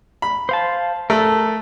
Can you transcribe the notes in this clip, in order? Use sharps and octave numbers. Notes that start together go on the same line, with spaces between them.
B5
C5 F5 A5
A3 A4 A#4